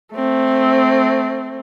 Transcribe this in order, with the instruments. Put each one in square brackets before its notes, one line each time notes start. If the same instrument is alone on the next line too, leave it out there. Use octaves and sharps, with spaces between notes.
[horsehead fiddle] A3 C4